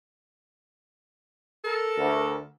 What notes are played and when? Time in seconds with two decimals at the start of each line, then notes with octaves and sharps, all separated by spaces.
1.64 A4 A#4
1.97 D2